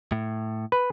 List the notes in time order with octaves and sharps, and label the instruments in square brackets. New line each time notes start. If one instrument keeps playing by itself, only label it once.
[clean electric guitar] A2
[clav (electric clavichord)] B4